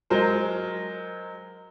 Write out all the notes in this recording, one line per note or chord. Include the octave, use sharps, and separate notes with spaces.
F#3 G#3 A#4 C5